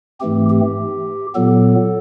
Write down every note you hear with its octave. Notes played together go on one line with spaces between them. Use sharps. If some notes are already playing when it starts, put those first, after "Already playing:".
G#2 E3 A3 C4 G4
G4
A#2 F#3 B3 A4